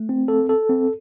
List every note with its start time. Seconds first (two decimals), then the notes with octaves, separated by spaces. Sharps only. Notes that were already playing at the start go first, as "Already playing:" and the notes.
Already playing: A3
0.09 C4
0.28 A4
0.49 A4
0.69 C4